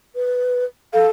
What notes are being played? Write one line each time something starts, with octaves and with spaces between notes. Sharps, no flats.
B4
A4 F5